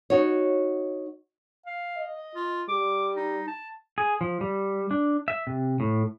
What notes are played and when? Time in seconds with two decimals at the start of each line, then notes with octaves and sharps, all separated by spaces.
0.10 D#4 F#4 C#5
1.66 F5
1.97 D#5
2.35 F4
2.69 G3 D6
3.16 D#4
3.48 A5
3.98 G#4
4.21 F3
4.41 G3
4.91 D4
5.28 E5
5.47 C3
5.80 A2